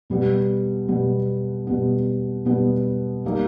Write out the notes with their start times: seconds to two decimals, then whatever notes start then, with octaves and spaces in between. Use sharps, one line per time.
0.10 B2 G3 B3
0.88 B2 G3 B3
1.67 B2 G3 B3
2.45 B2 G3 B3
3.25 G3 A#3 D#4